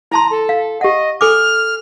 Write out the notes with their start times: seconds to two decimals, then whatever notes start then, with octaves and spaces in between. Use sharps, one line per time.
0.12 E4 A5 A#5 C6
0.31 A4
0.49 F5
0.81 G4 D#5 F#5
1.21 A4 G#5 D6 F6